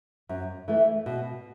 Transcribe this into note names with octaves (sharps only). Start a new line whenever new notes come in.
F#2
E3 A3
B2